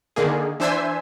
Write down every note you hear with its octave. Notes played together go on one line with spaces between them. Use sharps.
D3 D#3 A#3 G#4
E3 D4 C5 E5 G#5 E6